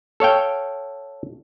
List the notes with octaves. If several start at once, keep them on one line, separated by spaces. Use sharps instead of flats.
A4 C#5 F5 G5